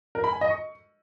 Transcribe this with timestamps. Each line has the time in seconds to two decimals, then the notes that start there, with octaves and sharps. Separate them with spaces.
0.15 A#4
0.24 B5
0.33 G#5
0.41 D#5
0.50 C#6